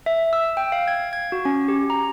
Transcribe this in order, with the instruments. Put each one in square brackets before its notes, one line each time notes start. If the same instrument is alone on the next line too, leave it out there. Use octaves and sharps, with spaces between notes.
[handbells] E5
E6
G5
F5
G#6
G#6
F#4
C#4
G4
A#5